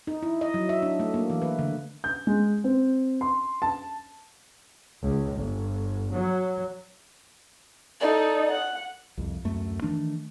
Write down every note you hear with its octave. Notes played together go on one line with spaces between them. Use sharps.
D#4
E4
D#5
F#3
E5
D4
A3
A#3
E3
B4
D3
G6
G#3
C4
C6
A5
C#2
G1
F#3
D#4 A4 D5
F#5
C2 F2
D1 F#2 A3
D#3 E3 A3 D4